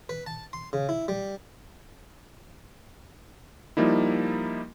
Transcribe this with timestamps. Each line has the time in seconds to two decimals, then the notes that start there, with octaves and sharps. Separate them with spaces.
0.09 B4
0.26 A5
0.53 C6
0.73 C#3
0.89 E4
1.08 G3
3.77 F3 G3 A#3 D#4 E4